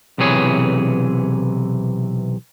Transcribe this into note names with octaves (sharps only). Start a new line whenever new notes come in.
B1 C3 E3 G#4 C#5